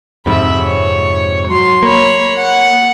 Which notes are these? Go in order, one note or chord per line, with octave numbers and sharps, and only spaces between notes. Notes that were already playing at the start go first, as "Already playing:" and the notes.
F2 G#2 C3 E5 B5
C#5
F#3 C6
A#3 C#5 B5
F#5